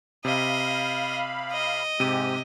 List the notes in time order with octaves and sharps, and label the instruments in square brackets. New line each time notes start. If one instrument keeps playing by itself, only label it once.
[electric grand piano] C3 [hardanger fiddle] D#5 [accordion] F5 B5
[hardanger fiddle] D#5
[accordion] G#2 G#3 G4 [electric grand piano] C3 D#7